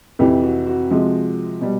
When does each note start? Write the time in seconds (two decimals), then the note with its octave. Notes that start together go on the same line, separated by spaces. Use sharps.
0.19 F2 C3 E3 G4
0.43 F#4
0.66 F#4
0.90 C3 F3 G#3
1.61 B2 G3